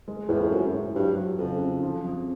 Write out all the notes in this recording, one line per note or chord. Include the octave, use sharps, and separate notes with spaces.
G#3
E2 A2
F2
F#2 G#3
A2
G2 F#3
F#3
F2 C#3
C#3
F3
F2